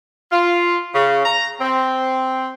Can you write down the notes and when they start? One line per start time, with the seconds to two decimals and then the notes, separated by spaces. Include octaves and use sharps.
0.32 F4
0.93 C#3
1.25 A#5
1.60 C4